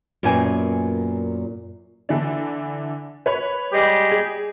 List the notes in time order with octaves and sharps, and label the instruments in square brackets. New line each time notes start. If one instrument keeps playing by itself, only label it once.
[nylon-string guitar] F#2 A#2 B3 G5 G#5
[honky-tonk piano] D3 E3 D4
B4 C#5 B5
[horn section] G3 G#3 G4
[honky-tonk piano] G#4